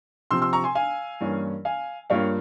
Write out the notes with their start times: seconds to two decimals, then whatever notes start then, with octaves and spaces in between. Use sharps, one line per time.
0.31 C3 F3 C4 C6 E6
0.42 C6 E6
0.53 A#5 C#6
0.64 G#5 C6
0.75 F5 G#5
1.21 G2 E3 A#3 C#4
1.65 F5 G#5
2.10 G2 G3 A#3 F4 C#5 F5